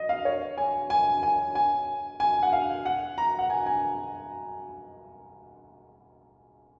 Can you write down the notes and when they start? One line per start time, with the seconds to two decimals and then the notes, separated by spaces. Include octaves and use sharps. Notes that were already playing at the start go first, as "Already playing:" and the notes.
Already playing: D#5
0.09 F5
0.25 C#5
0.57 G#5
0.90 G#5
1.23 G#5
1.55 G#5
2.20 G#5
2.43 F#5
2.53 F5
2.86 F#5
3.18 A#5
3.39 F#5
3.50 G#5
3.66 G#5